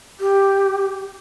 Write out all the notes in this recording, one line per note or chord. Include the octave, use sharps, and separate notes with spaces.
G4